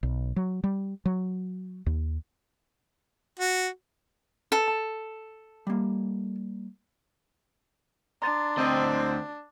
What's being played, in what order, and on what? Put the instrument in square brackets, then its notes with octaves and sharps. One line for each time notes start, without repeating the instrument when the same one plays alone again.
[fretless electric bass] B1
F#3
G3
F#3
D#2
[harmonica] F#4
[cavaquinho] A4
[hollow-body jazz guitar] A5
G3 A#3
[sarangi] D4 [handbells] A#5 C6 A6
[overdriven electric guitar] D2 D#5 [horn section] C4